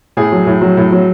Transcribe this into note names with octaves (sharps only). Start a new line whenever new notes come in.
A2 G#4
F#3
A2
F#3
A2
F#3